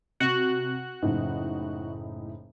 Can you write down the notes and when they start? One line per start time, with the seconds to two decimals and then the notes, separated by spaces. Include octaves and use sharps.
0.20 C3 F#4 F#6
1.03 F#1 A2 D#4